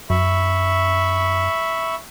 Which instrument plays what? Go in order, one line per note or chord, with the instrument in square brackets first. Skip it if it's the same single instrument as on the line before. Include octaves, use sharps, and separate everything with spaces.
[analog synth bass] F#2 [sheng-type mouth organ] E5 B5 C#6